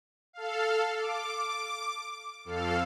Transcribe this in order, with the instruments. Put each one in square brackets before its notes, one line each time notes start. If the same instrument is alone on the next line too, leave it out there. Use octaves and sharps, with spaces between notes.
[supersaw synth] A4 F5
D6
F2 A4 F5